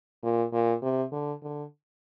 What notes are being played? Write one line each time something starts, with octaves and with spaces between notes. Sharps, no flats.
A#2
A#2
C3
D3
D3